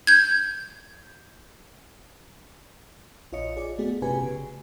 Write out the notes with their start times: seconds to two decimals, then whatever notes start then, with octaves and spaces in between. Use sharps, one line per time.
0.07 G6 G#6
3.32 A#1 F4 C#5 D#5 C#7
3.57 G#4 D5
3.79 A3 B3 F4 F#4 G#4
4.02 G1 C3 C#4 G4 B4 G#5
4.23 C#3